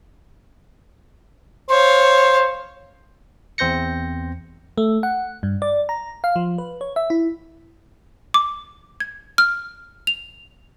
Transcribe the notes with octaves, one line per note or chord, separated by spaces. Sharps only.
C5 C#5 F5
E2 C4 C5 G6 A#6 C#7
A3
F#5
G2
D5
A#5
F5
F3
B4
C#5
E5
E4
D6
G#6
F6
F7